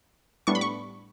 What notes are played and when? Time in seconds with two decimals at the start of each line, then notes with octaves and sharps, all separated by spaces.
0.47 A2 G3 B3 D4 C#6
0.55 B5
0.61 C#6